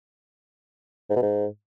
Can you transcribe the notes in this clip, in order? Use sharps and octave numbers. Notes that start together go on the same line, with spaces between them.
G#2
B2
G#2